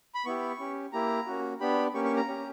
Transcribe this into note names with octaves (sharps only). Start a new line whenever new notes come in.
B5
B3 E4 G4 C#6
C#4 G4
A#3 E4 G4 A#5
A#3 C#4 F#4
B3 D4 G4 B5
A#3 C#4 G4 C#6
C#6
A#5
C#4 G4